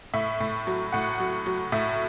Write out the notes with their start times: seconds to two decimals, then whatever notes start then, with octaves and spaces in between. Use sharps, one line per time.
0.14 A2 E5
0.40 A2
0.67 F#3
0.93 A2 F#5
1.20 F#3
1.46 F#3
1.72 A2 E5